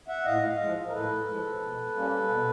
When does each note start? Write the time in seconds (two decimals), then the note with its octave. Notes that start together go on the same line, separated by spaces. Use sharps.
0.08 E5 F#5
0.25 A2 D#5 F5
0.48 D#5 F5
0.59 G#3
0.64 F3
0.88 A#4
0.93 A2 A4 B4
1.27 F3 G#3
1.61 B2
1.95 G3 A#3 C#4
2.29 B2